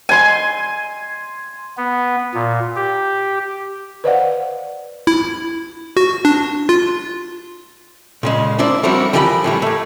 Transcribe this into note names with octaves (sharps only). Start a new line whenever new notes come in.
G#5 C6
B3
A#2
G4
B4 C5 D5 D#5 F5 F#5
E4
F#4
D4
F4
A#2 C#3 G#3
A#3 D4 E4 C5 D5
F3 G3 A#3 C4 E4 F#4
E3 F3 G4 A#4 D#5 B5
A2 E3 G3
A3 A#3